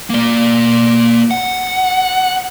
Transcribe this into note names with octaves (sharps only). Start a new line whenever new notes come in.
A#3 D5
F#5